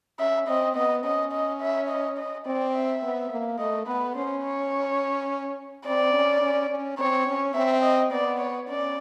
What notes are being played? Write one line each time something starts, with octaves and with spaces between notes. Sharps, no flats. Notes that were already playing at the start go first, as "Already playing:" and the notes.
C#4 E5
C4 D#5
B3 D#5
C#4 D#5
D#5
E5
D#5
D#5
C4 D5
E5
B3
A#3
A3 D#5
B3 B4
C#4 C5
C#5
C4 D5
C#4
C#4
C#4
C4 C#5
C#4
C4 E5
D#5
B3 D5
C#5
C#4 D5